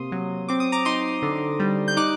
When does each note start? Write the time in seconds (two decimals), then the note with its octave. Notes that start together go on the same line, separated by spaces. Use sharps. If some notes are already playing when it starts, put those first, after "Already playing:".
Already playing: C3 A#3 C6 D#6
0.12 F#3
0.49 C4 D6
0.60 D#6
0.72 A#5 D6
0.85 D#4 C6 D#6
1.22 D3
1.60 G3
1.88 G6
1.97 D#4 D6 F#6